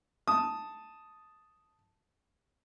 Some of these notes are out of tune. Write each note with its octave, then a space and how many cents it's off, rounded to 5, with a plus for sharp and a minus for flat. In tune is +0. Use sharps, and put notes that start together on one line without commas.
A5 +0 D#6 +0